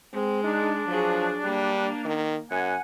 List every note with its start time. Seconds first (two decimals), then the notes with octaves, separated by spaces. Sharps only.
0.13 G#3 C4
0.44 D4 D#4
0.88 F3 F#3 G#4
1.44 G3 A#3
2.05 D#3
2.51 F#2 F#5 G#5